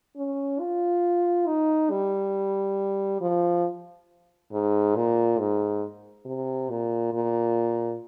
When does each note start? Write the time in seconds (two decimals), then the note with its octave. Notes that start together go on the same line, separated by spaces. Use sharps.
0.17 C#4
0.60 F4
1.47 D#4
1.91 G3
3.21 F3
4.52 G#2
4.96 A#2
5.39 G#2
6.26 C3
6.70 A#2
7.14 A#2